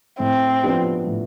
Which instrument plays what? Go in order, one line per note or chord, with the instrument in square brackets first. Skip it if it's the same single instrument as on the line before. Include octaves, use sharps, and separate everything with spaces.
[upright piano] A2 [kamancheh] C4
[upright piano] F3 B3 D4 G4
A2